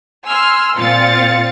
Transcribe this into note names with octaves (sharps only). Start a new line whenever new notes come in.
G#5 C6 E6 F6
A#2 C4 F4 A6 C#7